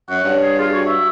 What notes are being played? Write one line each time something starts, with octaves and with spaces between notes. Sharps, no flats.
F#2 F#5
G2 C#5
G#4
F4 G#4
F#4 C#5
E5